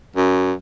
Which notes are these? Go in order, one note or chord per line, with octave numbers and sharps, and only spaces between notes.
F#2